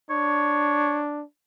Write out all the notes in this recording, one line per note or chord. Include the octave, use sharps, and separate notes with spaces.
D4 C#5